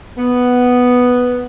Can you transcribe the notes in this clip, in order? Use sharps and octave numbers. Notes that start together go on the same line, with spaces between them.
B3